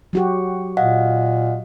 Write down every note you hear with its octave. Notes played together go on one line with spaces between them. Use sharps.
F#3 F#4 G4
A#2 D#5 F5 F#5